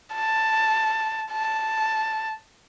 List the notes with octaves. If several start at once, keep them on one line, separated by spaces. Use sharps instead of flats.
A5
A5